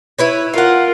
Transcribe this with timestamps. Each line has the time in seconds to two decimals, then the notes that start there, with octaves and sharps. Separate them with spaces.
0.18 E4 B4 C#5
0.54 F4 A#4 F5 F#5